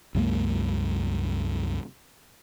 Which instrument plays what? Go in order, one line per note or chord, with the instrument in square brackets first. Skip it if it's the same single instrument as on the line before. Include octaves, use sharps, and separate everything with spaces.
[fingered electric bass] C2 F#2 G#3 A#3